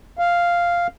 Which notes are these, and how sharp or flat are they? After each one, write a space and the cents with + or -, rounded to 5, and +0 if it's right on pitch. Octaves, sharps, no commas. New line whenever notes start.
F5 -5